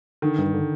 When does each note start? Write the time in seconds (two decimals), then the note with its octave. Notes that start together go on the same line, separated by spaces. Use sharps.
0.22 D3 D#3
0.39 G2
0.54 D3